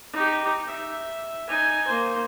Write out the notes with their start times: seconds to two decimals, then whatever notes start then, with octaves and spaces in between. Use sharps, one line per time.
0.13 D#4 G4
0.67 E5
1.47 D#4 G#5
1.87 A#3 C5